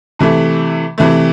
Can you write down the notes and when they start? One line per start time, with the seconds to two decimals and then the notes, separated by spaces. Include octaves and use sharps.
0.19 C3 E3 A3
0.98 C3 E3 A3